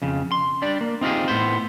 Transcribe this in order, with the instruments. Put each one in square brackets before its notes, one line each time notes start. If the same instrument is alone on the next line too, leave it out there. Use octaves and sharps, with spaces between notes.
[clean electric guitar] F2 C#3
C6
G3 D4 D5
A#3
C4 D#4 F4 G4 G#4
A2 B3 C5